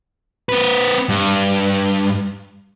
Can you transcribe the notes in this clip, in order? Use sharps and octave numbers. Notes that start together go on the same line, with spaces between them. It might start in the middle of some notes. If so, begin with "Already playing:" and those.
C4 B4
G2